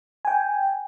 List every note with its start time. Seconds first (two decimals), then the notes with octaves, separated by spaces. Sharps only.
0.25 G5 G#5